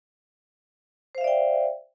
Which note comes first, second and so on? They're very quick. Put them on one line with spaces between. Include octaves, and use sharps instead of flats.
C5 F5 E5 D5 G5